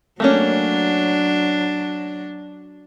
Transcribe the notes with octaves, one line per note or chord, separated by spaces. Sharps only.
F#3 A3 A#3 C#4 D4